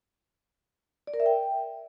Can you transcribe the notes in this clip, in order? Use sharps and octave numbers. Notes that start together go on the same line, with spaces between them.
D5
A#4
E5
G5